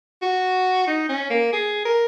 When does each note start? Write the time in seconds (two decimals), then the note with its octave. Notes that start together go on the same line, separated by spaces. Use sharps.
0.22 F#4
0.87 D#4
1.09 C#4
1.30 A#3
1.53 G#4
1.85 A#4